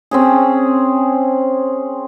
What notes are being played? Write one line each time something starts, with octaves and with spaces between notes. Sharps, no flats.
C4 C#4 G#4